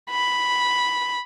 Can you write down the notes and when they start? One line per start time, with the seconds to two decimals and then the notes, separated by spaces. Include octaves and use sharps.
0.11 B5